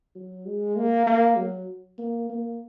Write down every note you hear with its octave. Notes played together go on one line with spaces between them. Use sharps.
F#3
G#3
A#3
A#3
F#3
A#3
A#3